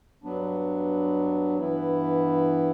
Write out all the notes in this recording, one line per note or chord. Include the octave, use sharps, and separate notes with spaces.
G2 F#3 B3 D4
G2 E3 B3 E4